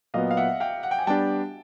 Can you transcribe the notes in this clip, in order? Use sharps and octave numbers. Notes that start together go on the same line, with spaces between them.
A#2 F#3 B3 D#5 F5
F5
E5 F#5
F5 G5
F#5
G5
G#5
G3 B3 D4 G4 G5 A5